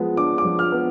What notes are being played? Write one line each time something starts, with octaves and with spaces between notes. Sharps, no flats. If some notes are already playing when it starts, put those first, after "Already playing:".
Already playing: F3 G#3 B3
D4 D6
D6
F3
F6
B3